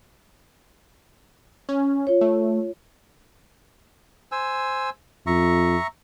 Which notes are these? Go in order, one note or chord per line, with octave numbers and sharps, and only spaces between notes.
C#4
F4 C#5
A3
C5 G#5 E6
F2 E5 A#5 C#6